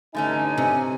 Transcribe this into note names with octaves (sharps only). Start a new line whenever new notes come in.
A1 G2 D3 A3 C#4 D#4 G#5
C3